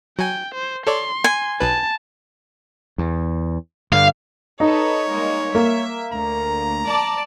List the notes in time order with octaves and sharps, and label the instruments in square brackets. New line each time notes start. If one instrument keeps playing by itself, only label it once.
[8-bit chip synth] F#3 G#5 [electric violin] G5
[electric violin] C5
[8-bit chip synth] A4 C#5 D5 [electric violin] C6
[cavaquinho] G#5
[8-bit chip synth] B1 B4 [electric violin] A5
[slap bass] E2
[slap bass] G2 D3 [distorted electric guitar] F5
[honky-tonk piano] D#4 [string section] A4 B4 [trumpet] C#5
[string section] G3 G#3 A#3
[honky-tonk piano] A#3 [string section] E5
[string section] D2 [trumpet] A#5
[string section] D5 A5 D6